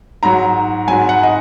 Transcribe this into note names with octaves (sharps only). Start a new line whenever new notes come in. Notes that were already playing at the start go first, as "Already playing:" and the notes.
G#2 F#3 A#5
G#2 F#3 G#5
F#5
D#5